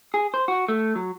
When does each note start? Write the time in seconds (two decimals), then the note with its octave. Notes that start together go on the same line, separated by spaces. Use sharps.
0.14 G#4
0.34 C5
0.48 F#4
0.68 A3
0.96 F#3